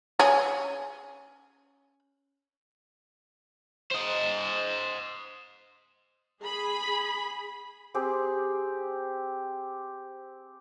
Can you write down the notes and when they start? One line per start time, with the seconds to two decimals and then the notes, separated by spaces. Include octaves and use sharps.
0.19 C#4 G#4
3.91 C5 D#5
6.43 G#4 B5
7.94 C4 G4 G#4